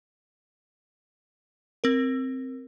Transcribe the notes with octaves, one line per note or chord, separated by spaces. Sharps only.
C4 A#4